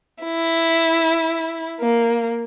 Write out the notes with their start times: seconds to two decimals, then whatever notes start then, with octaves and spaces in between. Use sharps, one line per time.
0.23 E4
1.80 A#3